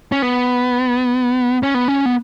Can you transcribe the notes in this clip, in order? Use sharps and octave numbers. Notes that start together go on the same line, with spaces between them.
C#4
B3
C#4
B3
C#4
B3